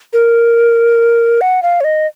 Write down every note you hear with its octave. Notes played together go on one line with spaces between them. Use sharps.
A#4
F#5
F5
C#5
D#5